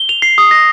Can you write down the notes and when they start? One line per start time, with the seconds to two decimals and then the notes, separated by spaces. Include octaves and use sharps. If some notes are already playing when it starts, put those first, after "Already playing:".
Already playing: G7
0.09 F7
0.22 C7
0.38 D#6
0.51 A#6